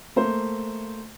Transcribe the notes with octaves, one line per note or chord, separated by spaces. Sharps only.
A3 A#3 C5